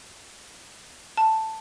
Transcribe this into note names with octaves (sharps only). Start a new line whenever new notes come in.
A5